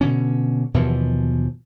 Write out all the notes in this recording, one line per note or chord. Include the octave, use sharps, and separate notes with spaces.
B2 D3 C#4
D#2 B2 E3 F3